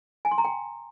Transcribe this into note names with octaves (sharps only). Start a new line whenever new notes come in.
G#5
C6
A#5
G5